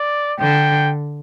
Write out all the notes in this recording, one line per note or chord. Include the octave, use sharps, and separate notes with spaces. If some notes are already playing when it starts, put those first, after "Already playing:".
Already playing: D5
D3 G5